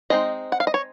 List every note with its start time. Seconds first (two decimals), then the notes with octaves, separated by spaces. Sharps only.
0.10 G#3 C4 D#4 D#5
0.52 F#5
0.60 F5
0.67 D#5
0.74 C#5